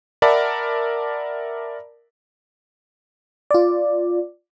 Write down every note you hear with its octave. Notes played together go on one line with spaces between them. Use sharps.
A#4 D5 E5 F#5 A5 B5
F4 D5